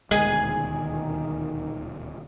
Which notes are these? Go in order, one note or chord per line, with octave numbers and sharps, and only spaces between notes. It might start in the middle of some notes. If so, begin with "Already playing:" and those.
D#1 D2 B2 D#3 G#3 G#4